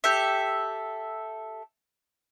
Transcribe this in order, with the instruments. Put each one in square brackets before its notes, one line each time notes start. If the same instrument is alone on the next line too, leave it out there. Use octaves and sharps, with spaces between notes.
[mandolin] G4 A4 E5